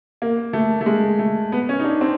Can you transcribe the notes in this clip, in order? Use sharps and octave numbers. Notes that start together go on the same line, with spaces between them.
A#3
A3
A3
G#3
A3
B3
C#4
D#4
D4
C4